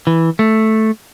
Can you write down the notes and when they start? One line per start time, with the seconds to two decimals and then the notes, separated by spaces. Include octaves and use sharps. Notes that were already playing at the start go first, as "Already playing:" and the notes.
0.07 E3
0.39 A3